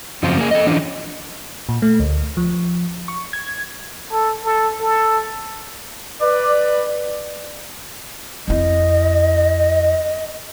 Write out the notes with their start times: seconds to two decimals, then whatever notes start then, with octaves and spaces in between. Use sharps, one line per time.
0.23 F#2 C#3 F3 C4 F4
0.38 A#3 G#4
0.51 A4 D#5
0.66 E3 F3 C#4 D4
1.69 A#2
1.82 A3
2.00 D2
2.37 F3
3.08 C#6
3.33 G#6
4.12 A4
4.44 A4
4.81 A4
6.21 B4 D5
8.48 F2 E4 D#5